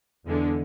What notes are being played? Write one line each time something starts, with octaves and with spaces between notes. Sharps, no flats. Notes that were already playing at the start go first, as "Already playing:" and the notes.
E2 D3 G#3